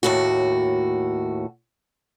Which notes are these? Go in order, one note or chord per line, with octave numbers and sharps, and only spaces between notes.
D#2 A2 F#4